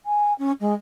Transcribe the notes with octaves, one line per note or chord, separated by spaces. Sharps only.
G#5
C#4
G#3